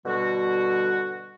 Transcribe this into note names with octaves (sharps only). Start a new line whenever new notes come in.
B2 D3 G3 F#4